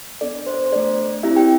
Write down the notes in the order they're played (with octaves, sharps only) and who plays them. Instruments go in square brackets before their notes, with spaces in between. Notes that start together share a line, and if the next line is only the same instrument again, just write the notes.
[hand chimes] B3 D4 A4 D5
C5
C5
A3 D4 A4 D5
C4 E4 G4 E5
G4 G5